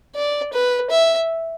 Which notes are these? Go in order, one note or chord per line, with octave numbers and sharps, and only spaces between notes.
D5
B4
E5